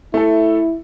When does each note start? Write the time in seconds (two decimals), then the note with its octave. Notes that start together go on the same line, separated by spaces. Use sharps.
0.14 A3 E4 A4